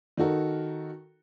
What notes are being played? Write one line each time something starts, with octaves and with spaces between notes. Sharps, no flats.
D#3 D#4 F#4 A4 A#4